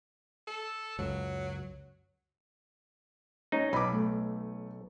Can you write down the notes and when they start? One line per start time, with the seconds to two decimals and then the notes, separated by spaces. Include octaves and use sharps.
0.47 A4
0.99 C#2 F#2 F#3
3.52 C#4 D#4
3.73 B1 B5 D6
3.92 A3